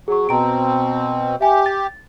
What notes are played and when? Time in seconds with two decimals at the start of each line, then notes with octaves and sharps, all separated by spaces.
0.08 F#3 G#4 C#6
0.29 B2 C4 A5 A#5 D7
1.41 G4 E5 G#5
1.66 A6